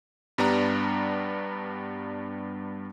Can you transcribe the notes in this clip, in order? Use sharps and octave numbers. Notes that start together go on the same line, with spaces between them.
G2 G3 B3 D4 A#5